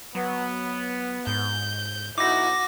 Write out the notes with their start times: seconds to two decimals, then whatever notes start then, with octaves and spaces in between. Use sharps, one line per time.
0.15 F#3 B3
1.27 G#2 G6
2.18 B1 D#4 E4 F#4 D6 A#6